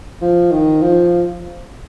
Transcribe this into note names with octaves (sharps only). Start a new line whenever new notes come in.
F3
D#3
F3